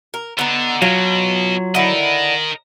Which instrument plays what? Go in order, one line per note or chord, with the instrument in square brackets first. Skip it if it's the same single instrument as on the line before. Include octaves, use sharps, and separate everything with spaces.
[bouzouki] A#4
[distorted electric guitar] D3 [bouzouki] B3 D#4
[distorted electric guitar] B2 [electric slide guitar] F#3 [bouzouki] F4
[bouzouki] D3 E4 [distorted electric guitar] A#4 D#5